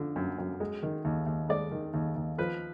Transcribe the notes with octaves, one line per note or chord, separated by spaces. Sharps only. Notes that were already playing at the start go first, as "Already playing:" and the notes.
Already playing: D3 F3
F#2
F#2
G#3
D#3
D#2
D#2
G#3 D5
D#3
D#2
D#2
F3 B4